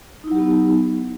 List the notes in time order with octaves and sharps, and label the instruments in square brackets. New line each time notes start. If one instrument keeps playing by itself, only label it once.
[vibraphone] D#4
E4
F#3
G4
B3